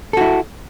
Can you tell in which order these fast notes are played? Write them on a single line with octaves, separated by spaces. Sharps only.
A4 F#4 E4